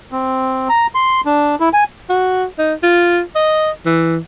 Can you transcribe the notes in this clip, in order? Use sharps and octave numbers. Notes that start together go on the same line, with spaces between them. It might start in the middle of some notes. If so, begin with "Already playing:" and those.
C4
A#5
C6
D4
E4
G#5
F#4
D#4
F4
D#5
E3